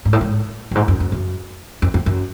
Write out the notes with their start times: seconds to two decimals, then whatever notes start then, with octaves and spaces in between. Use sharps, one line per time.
0.05 G#2
0.13 A2
0.21 G#2
0.71 G2
0.75 G#2
0.88 F#2
1.00 F#2
1.12 F#2
1.82 F2
1.94 F2
2.06 F#2